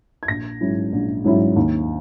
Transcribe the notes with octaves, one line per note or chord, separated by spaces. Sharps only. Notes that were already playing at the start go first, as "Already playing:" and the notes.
G#6
A#1 A#6
G#2 F#3 C#4 E4
A#1
G#2 F#3 C#4 E4
D#2